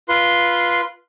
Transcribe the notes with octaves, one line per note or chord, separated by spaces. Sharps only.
F4 B4 C6